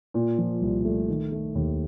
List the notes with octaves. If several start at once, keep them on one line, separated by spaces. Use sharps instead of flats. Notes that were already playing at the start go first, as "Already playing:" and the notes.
A#2
F3
C2
A3
D#3
A3
D#2